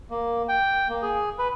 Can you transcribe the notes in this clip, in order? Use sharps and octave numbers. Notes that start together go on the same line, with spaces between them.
A#3
G5
A#3
G#4
B4